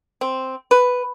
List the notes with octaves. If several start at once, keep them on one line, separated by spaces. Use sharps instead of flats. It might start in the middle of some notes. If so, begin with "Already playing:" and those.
C4
B4